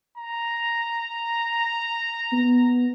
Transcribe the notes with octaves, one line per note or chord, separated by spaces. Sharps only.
A#5
B3